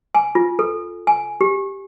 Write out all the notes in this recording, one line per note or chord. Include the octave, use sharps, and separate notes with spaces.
G#5
F4
A4
G#5
G4